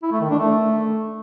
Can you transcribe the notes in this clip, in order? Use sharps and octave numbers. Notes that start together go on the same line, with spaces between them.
E4
A3
D#3
D4
A3